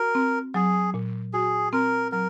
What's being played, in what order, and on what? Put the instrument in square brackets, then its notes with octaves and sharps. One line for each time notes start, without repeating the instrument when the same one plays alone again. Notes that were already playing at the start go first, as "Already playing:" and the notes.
Already playing: [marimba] F#4 [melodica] A#4
[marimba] C4
[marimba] F#3 [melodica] G#4
[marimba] A#2
[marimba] F#4 [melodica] G#4
[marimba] C4 [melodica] A#4
[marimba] F#3 [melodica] A#4